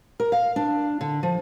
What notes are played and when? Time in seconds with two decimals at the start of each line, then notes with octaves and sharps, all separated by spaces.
0.20 A#4
0.32 F5
0.56 D4
1.01 D3
1.23 F3